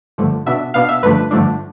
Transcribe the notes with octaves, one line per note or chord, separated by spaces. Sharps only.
G2 D3 F3 A3
B2 B3 D4 E5
B2 B3 D4 F5
E5
G2 D3 F3 A3 D4 B4
G2 D3 F3 A3 D4